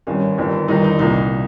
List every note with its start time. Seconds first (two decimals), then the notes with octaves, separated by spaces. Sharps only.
0.07 G#1 G2 D#3 C#4
0.38 G1 G2 D#3
0.68 G1 G2 D#3 D#4
0.84 D#4
0.99 C2 A#2 D#4